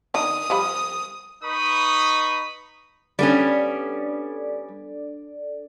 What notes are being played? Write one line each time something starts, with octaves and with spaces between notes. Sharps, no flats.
D#3 D4 D#6
F3 G3 B5
D#4 B4 B5 C#6 D#6
G3 B3 C#4 D4 A4 D5